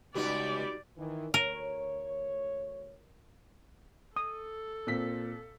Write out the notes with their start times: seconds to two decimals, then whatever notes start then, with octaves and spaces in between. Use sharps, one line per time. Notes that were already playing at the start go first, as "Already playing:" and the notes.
0.15 C#2 G3 B3 D#4 F#4 G4 D5
0.97 D#3 E3
1.34 D2 A#4 C#5
4.16 A4 D#6
4.87 A#2 C4 B6